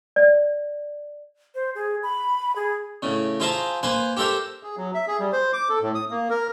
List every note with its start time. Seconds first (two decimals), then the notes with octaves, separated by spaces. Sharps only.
0.16 D5
1.55 C5
1.75 G#4
2.03 B5
2.56 G#4
3.02 A2 C#3
3.40 F4 G#4 C5 E5 A5 A#5
3.83 A#3 B4 C5 G#5
4.17 G4 A4 A#4 C5 E5
4.63 G#4
4.77 F#3
4.94 E5
5.07 G#4
5.20 G3
5.33 C5
5.53 D6
5.69 A4
5.81 A2
5.95 D#6
6.11 A#3
6.30 A#4